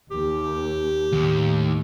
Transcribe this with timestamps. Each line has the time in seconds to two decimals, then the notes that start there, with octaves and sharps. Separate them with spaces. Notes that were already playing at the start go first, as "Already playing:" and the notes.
0.11 D#2 G4
1.12 D#2 A2